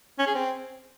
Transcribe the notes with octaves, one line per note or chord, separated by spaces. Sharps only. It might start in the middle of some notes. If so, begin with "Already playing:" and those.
C#4
G#4
C4